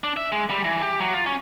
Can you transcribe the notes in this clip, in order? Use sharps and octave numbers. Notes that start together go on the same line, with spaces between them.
D4
E5
G#3
G3
E3
G4
F#3
F4
C#4